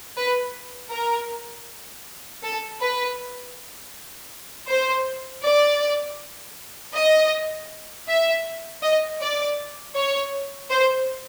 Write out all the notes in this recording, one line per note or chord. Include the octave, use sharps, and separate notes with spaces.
B4
A#4
A4
B4
C5
D5
D#5
E5
D#5
D5
C#5
C5